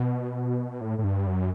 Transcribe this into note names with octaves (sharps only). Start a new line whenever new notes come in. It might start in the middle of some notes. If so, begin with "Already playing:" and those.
Already playing: B2
A2
A2
G2
F#2